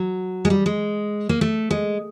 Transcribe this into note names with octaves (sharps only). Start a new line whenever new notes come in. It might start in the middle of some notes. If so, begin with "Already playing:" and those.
Already playing: F#3
G#3
G3
G#3
A#3
A3
G#3